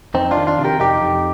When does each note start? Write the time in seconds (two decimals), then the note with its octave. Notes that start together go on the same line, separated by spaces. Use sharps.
0.14 F2 C4 D#4
0.31 D4 F4
0.37 D#3
0.47 D4 F4
0.59 C3
0.64 G4 A#4
0.80 F2 D#4 G4
1.02 F2